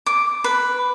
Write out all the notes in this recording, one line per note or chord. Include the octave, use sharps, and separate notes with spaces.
D6
B4